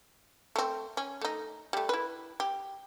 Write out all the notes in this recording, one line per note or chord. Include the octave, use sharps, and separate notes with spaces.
A3 C4
C#4
A3 D#4
G3 A3
E4 B4
G4